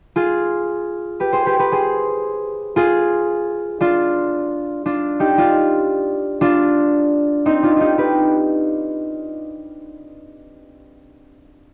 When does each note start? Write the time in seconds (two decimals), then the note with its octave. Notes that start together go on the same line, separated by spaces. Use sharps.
0.16 F4 G#4
1.20 G4 B4
1.33 G#4 C5
1.46 G4 B4
1.59 G4 B4
1.72 G#4 C5
2.76 F4 G#4
3.81 D4 F4
4.86 D4 F4
5.20 D#4 G4
5.38 D4 F4
6.41 D4 F4
7.46 C4 D#4
7.63 D4 F4
7.76 D#4 F4 G4
7.98 G4 B4